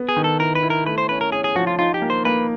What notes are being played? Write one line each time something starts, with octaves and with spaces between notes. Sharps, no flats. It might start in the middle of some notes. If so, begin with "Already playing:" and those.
Already playing: B3
G#4
D#3
A4
E4 A#4
B4
E4
A#4
A3 B4
C5
C#4 B4
A#4
C#4 G#4
G#4
F3 F#4
F4
D#4 F4
G4
A#3
C5
A#3 B4